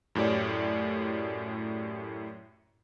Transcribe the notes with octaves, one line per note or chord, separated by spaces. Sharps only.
F#2 A2 G4 C#5 D5